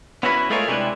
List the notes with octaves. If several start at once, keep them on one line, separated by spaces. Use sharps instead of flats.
B3 C#4 E4 F#4 B4
G#3 A3 F4 G#4 A#4 C#5
C3 G3 G#3 D4 E4 B4